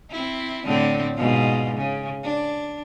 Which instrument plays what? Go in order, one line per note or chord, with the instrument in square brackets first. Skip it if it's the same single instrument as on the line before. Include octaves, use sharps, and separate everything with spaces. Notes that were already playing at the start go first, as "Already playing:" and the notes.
[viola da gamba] C4 E4
A2 D3 C4
G#2 B2 F4
C#3
D4